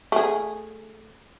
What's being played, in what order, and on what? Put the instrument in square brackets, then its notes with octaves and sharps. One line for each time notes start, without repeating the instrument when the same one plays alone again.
[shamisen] A3 G#4